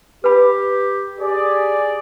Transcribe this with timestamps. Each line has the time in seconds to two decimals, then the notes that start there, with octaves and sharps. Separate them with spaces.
0.24 G4 B4 B5
1.19 G4 G#4 D5